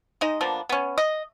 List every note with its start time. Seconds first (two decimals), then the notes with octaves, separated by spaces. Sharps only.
0.21 G#3 D#4 D#5
0.41 F3 A#3 B3 D4
0.69 B3 C#4
0.98 D#5